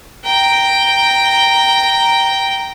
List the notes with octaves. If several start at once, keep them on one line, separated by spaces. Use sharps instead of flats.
G5 A#5